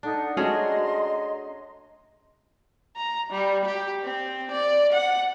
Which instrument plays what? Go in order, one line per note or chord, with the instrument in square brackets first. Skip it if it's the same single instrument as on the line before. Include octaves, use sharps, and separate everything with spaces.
[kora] D4 [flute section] D#4 A4 F#5
[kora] A3 D4 [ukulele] C#4 F#4 G#4 [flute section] D#5 A#5 C6
[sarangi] A#5
G3
G4
C4
D5
F#5